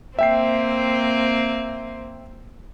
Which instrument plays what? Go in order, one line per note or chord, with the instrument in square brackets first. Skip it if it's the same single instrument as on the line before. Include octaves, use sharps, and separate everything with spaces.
[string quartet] A#3 C4 C5 [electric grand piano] E5 G5 C7